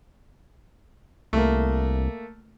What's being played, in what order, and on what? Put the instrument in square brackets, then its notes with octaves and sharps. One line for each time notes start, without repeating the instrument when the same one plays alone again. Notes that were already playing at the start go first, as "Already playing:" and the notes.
[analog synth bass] C2 [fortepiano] A3 A#3